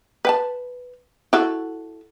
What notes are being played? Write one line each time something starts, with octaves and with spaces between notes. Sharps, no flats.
B4 G5 A5
E4 F#4 A4